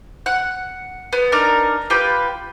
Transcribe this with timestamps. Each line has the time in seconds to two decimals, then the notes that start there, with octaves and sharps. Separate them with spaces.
0.26 F#5
1.13 B3
1.32 D4 D#4 A#4
1.90 F4 G4 B4 G5